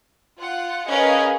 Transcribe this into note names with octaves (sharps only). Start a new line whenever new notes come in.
F4 F#5
C#4 G#4 A#4 B4 D#5 F5